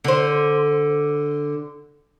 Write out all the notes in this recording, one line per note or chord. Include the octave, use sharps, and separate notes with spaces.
D3 C5